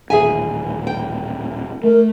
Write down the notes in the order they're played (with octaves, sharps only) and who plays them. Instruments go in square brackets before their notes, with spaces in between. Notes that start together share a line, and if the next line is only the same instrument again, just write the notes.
[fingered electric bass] D#1 A1 D#2 [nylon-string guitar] G#4 E5 G#5
[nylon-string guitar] G5
[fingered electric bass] A3 [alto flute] A#4